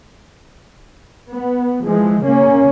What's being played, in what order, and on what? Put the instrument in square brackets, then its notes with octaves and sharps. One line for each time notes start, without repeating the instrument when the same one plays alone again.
[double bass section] B3
E3 F3 G#3
C#3 A#3 C#4